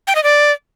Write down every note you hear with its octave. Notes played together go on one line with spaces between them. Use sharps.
G5
D#5
D5